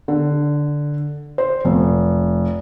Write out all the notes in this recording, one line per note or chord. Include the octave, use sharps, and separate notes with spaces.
D3
C5
F1